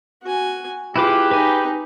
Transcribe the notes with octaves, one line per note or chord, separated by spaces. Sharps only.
F#4 G#5
E4 F4 G4 G#4 B4 D6
D#4 B4 G#5